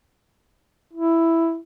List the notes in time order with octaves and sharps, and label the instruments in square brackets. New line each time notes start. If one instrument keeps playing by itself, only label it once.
[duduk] E4